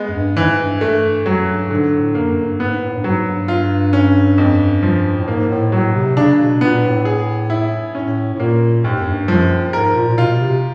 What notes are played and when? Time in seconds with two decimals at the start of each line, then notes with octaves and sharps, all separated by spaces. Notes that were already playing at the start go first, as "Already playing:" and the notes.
Already playing: G#3 B3
0.09 F#2
0.14 G2
0.37 G#2 E3
0.59 G2
0.81 G2 A3
1.03 G2
1.26 F#2 F#3
1.48 G2
1.70 G#2 D3
1.88 G#2
1.93 A2
2.15 F#2 A#3
2.31 F#2
2.37 G2
2.60 G#2 B3
2.82 A2
2.95 G2
3.04 G#2 F#3
3.27 G2
3.48 F4
3.93 C#4
4.38 F2
4.83 F3
5.17 A2
5.27 G#2 A#3
5.49 A2
5.72 A2 F#3
5.94 C3
6.16 C#3 D4
6.39 B2
6.61 A#2 B3
6.84 A2
7.05 G#4
7.50 E4
7.95 A2 C#4
8.34 A2
8.40 A#2 A#3
8.84 D#2 G#2
9.00 F#2
9.06 G2
9.28 F#2 F3
9.73 G#2 A#4
9.95 A#2
10.08 A#2
10.17 B2 F4
10.40 C3